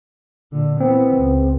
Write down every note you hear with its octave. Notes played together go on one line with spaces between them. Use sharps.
A#2 D3
E3 B3 C4
C#2